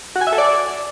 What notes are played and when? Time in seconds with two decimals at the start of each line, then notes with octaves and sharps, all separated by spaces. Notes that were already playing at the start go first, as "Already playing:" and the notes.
0.16 F#4
0.21 G#5
0.27 E5
0.32 A4
0.38 D5